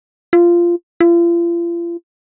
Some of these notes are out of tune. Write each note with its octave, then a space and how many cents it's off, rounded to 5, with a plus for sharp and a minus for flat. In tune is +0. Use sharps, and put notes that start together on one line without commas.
F4 -15
F4 -40